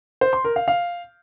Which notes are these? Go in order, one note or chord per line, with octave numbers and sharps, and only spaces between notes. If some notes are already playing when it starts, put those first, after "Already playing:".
C5
C6
A#4
F5
F5